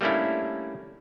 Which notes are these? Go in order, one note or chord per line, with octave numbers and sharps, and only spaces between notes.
G3 A3 A#3 C#4 D4 E4